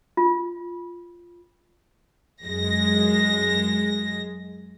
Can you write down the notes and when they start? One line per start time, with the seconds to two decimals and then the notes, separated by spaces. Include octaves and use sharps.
0.17 F4
2.43 F#2 G#3 A#6